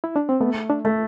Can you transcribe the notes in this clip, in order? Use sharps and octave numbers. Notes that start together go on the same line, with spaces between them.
E4
D4
C4
A3 B3
D4
A3